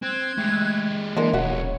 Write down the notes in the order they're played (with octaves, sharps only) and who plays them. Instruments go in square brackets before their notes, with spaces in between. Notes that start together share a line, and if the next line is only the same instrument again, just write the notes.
[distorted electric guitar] C4 [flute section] E6 F#6 G#6
[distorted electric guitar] G#3 G4 [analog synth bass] A3
[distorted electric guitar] E3 [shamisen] G#3 D4 A#4 [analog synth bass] A#3 [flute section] E5
[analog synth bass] D#1 [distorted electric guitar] B1 C#4 [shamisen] F#4 E5 [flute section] C#5